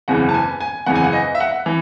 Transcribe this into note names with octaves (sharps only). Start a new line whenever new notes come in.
F#1 E2 C#3 E3 F#5
A5
G#5
G#5
F#1 E2 C#3 E3 F#5
G#5
F#5
D#5
E5
F#5
E3